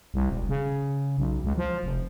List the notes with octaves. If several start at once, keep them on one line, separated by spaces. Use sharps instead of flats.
C2
E1
C#3
B1
C#2
F3
F1